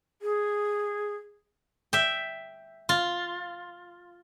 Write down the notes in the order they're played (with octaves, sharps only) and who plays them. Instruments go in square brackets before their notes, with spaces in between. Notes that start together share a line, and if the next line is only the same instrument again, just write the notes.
[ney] G#4
[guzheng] E5 G5
F4